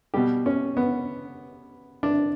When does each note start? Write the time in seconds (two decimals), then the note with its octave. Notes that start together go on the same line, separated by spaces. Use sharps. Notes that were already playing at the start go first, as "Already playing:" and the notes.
0.14 B2 G3 G4
0.46 C#4
0.77 B3
2.03 D4